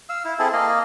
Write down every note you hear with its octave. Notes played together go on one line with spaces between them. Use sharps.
F5 E6
E4
C4 E4 G#4 A4
A#3 D#5 F5